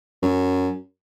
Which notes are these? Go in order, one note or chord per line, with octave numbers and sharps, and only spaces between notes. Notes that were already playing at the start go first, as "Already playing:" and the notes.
F#2